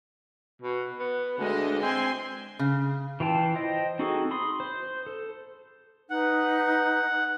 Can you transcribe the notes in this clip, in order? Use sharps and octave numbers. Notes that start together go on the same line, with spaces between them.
B2
B3
D2 G#3 D4 D#5
C4 G#5 C6
C#3
E3 F4 G5 A5
C5 D#5 G5
C4 D#4 F#4 G#4 A4
B5 C6 D#6
C5
A4
D#4 B4 F#5